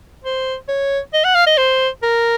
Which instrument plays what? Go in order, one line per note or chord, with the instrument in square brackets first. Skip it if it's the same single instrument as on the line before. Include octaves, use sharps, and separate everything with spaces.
[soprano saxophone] C5
C#5
D#5
F#5
F5
D#5
C5
A#4